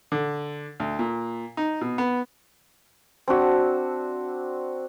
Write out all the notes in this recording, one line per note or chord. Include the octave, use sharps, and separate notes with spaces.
D3
D2
A#2
D#4
B2
B3
C4 D4 F#4 E5